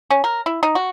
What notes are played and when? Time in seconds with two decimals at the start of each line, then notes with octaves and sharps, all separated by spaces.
0.10 C#4
0.24 A#4
0.46 E4
0.63 D#4
0.75 F#4